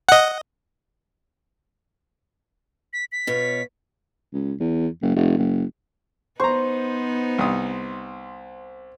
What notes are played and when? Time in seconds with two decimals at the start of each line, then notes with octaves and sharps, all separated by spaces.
0.09 D#5 F#5
2.93 B6
3.12 B6
3.27 B2 F4 C#5
4.33 C#2
4.60 E2
5.02 F#1
5.16 F1
5.38 F#1
6.40 B3 D#4 C5 A#5 C#6
7.39 C2 D#6